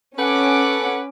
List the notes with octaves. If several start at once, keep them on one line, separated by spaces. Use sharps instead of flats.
C#4 A4 B4 F#5 D6